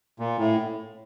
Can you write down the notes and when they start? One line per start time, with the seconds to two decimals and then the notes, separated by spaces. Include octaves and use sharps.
0.19 A#2
0.39 A2